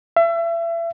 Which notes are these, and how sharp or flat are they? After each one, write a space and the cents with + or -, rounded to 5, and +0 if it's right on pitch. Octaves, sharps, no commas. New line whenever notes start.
E5 +35